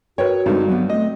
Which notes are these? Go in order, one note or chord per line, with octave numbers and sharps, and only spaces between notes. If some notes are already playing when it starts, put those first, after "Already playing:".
F#4 A#4 B4 C#5 G5
G2 D3 G#3 C4 D#4
F#3 B3 F#5
A3 C4 D#5